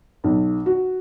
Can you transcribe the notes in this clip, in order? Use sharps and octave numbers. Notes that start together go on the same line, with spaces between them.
B1
F#4